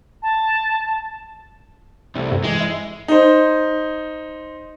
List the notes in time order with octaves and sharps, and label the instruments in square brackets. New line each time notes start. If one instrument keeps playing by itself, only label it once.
[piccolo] A5
[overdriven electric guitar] C2 [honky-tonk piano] C3 A3
[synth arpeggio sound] G2
[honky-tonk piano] E3 [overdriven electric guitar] G#3
[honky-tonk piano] E4
[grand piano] D#4 C5